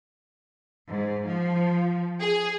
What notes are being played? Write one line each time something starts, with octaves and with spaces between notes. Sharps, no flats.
G#2
F3
G#4